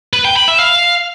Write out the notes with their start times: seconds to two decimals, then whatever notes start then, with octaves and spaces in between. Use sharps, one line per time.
0.13 B4
0.25 G5
0.36 B5
0.48 E5
0.59 F5